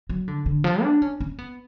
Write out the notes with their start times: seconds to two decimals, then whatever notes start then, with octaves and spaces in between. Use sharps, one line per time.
0.09 F#3
0.28 D3
0.46 D3
0.64 F3
0.83 D4
1.02 C#4
1.20 C#4
1.39 B3